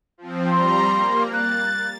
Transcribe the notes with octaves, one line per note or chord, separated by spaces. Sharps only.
F3 C4
G3 A#5 C6
A#3
F#6 A6